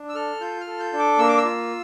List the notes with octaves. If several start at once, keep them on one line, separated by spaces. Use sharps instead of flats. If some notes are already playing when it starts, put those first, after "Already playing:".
Already playing: D4
E6
A4 F6
F4 G6
F6
A4
G6
D4
D6
A#3 E6
D6
E6
F4